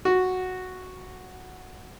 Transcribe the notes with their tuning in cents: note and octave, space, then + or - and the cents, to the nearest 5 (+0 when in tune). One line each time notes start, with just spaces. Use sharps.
F#4 -5